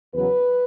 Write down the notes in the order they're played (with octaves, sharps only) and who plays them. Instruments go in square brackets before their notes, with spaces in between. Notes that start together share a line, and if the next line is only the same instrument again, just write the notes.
[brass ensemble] E2 C#3 F#3 B4